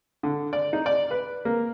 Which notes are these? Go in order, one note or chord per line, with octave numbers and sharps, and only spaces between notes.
D3
D5
D#4
D5
B4
A#3